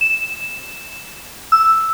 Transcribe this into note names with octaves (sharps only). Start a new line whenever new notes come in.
E7
E6